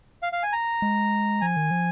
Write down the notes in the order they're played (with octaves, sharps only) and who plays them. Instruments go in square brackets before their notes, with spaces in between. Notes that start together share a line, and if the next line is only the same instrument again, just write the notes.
[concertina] F5
F5
G#5
A#5
[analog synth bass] G#3
[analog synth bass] F3 [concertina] G#5
[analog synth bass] D#3
F3